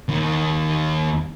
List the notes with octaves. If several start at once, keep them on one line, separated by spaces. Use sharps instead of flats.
D#2